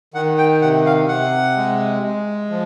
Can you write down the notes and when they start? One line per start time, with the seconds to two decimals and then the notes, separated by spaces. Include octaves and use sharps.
0.14 D#3 F#5
0.38 G5
0.61 C3 F#5
0.86 F5
1.08 C3 F#5
1.56 G#3
2.03 G#3
2.50 F3